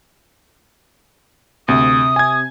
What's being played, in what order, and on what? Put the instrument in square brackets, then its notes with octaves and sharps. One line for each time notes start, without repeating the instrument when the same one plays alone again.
[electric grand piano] D2 [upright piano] C3 [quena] D#6
[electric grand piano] G#5 G#6